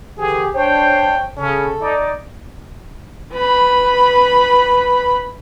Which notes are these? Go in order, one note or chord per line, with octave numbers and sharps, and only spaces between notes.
D3 E3 G4 G#4
D4 C5 C#5 G5
C#3 C#4 A4
D#4 D5
B4 B5